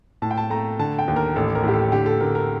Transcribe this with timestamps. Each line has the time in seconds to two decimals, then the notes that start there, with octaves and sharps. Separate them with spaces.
0.22 A2 A5
0.31 G5
0.38 A5
0.50 A3 A#5
0.79 D3 A5
0.99 G5
1.08 D#2
1.16 A#4
1.36 A1 A4
1.55 A#4
1.63 A2 G4
1.74 A4
1.92 D3 G4
2.06 A4
2.20 D3 A#4
2.35 A#4